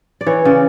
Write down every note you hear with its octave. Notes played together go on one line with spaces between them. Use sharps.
D5
E3 C#5
C#3 D5